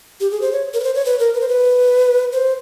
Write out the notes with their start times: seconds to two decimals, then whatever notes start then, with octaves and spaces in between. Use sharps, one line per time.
0.20 G4
0.31 G#4
0.41 C5
0.53 C#5
0.74 A#4
0.80 B4
0.84 C5
0.95 C#5
1.05 B4
1.19 A#4
1.34 B4
1.41 C5
1.48 B4
2.32 C5